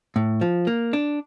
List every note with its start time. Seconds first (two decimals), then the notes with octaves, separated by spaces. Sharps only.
0.16 A2
0.41 F3
0.67 A#3
0.93 D4